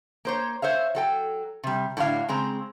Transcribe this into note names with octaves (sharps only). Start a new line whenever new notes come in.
A#3 C5 C#5
C5 C#5 E5 F5
F#3 A4 G5
C3 G3
A2 D3 F#3 D4 F5
C#3 G#3 C4 A#5